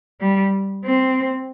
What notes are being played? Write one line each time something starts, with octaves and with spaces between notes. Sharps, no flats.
G3
C4